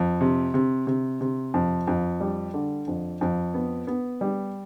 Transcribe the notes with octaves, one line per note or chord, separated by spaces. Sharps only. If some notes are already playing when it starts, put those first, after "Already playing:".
Already playing: F2
C3
C3
C3
C3
F2
F2
G3
D3
F2
F2
B3
B3
G3